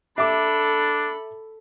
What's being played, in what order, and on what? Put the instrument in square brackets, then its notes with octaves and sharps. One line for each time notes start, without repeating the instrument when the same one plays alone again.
[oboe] D4 [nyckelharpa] A4 B5 [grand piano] E5 D6